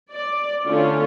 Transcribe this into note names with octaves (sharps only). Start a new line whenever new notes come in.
D5
D3 A3 C#4 F4